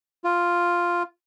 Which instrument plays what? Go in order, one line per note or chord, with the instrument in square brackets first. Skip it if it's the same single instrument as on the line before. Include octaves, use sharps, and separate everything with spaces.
[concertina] F4